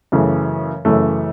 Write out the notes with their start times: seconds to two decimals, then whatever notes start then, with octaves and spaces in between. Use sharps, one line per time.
0.12 F#2 C#3 E3 A3
0.85 F#2 C#3 E3 A3